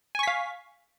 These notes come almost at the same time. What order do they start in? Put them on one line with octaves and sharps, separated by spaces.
G#5 C#6 B6 F5